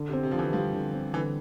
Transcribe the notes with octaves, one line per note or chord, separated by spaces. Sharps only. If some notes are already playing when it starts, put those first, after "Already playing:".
Already playing: D3
C3
C4
C3
D3 F3
E3
F3 G3
D3
C4
D3 E3